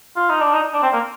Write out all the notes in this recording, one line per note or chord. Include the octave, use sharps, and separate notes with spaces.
F4
D#4
D4
D#4
D4
C4
A#3